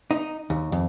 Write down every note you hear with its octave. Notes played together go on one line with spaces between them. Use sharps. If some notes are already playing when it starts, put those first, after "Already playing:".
D#4
D#2
F2